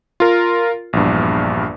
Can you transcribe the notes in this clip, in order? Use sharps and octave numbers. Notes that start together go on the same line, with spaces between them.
F4 A#4
A#1 E2 G2